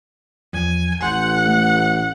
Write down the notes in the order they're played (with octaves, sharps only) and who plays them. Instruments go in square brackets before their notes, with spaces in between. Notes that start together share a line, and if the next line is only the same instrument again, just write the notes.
[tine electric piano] E2 F3 [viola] G#5
[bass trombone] A1 [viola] F#5 [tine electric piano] G#5 C6 G6
[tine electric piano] A3